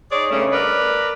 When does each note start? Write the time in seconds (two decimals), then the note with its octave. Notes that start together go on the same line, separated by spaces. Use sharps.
0.12 D#4 G#4 C#5 D5
0.30 G2 C#3 A3 C#4
0.52 A#4 B4 D5